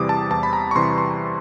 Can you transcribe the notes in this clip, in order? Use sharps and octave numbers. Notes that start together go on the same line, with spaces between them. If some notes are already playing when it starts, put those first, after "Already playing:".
Already playing: E2 C3 E3 G3 D6 D#6
A5
E2 A5
B5
A#5
C#6
C3 E3 G3 C6
C6